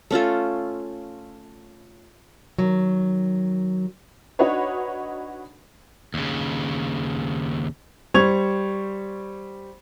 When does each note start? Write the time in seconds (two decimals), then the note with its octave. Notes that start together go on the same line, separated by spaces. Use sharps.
0.11 A3 C#4 F4 A4
2.58 D#3 F#3
4.39 D4 D#4 F#4 B4 C#5
6.14 D#2 C#3
8.14 G3 C5 C#6 G#6 F7